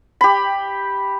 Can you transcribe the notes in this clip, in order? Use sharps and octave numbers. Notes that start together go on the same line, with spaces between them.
G4 B5